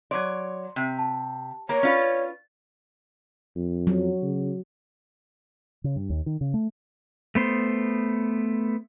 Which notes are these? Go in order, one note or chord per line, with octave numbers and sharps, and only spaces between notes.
F#3 C#5 D5 C6
C3
A5
A#3 A#4 C#5 A#5
C#4 F4 B4 D5
F2
F#3
C#3
C#3
G2
D#2
D#3
C#3
A3
A3 B3 C5